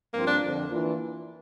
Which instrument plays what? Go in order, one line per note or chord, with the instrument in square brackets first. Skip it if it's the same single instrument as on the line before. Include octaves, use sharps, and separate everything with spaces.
[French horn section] G2 F3 C4 F4 [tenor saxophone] A#3
[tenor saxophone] D4
[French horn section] F2 D3 F3 C4
E3 A#3 D4 F4